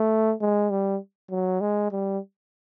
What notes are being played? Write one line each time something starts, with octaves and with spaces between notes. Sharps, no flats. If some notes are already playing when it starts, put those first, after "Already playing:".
Already playing: A3
G#3
G3
F#3
G#3
G3